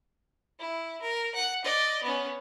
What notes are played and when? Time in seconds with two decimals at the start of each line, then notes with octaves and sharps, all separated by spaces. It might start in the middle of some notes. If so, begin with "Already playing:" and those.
0.59 E4
1.02 A#4
1.35 F#5
1.64 D5 D#5
2.03 B3 C#4